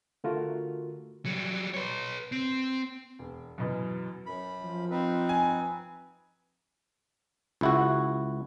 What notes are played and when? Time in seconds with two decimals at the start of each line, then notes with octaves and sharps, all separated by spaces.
0.24 D3 A3 F4 F#4 A#4
1.26 F#3 G3
1.74 B4 C#5
2.32 C4
3.19 E1
3.58 F#2 B2 E3
4.26 F#2 B5
4.62 F3
4.91 C4 D#4 B4
5.29 G#5
7.61 C#2 E4 F#4